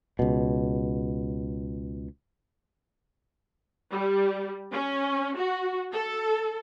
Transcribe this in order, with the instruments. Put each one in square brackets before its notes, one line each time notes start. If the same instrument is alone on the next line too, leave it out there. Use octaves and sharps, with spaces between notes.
[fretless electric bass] C#2 B2
[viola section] G3
C#4
F#4
A4